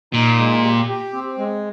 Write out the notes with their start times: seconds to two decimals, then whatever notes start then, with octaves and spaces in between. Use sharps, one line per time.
0.13 A#2 D#4
0.38 G#3
0.64 G4
0.88 G4
1.13 C4
1.38 G#3